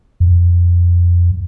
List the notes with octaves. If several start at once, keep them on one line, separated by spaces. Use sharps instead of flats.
F2